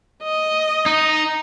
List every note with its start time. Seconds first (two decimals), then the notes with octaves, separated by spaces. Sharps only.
0.23 D#5
0.86 D#4